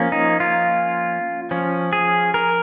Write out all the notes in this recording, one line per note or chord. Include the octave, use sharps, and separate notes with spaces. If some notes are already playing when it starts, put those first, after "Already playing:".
Already playing: F3 A#3 C#4
D#4
F4
F3 C#4
G#4
A#4